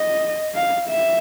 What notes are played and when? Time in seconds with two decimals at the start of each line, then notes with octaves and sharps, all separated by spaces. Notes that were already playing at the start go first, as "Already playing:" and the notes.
Already playing: D#5
0.55 F5
0.88 E5